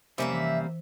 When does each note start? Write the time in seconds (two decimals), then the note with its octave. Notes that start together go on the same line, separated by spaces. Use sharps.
0.18 F2 C3 G3 A#3 C4 C#4 C5 E5
0.31 E3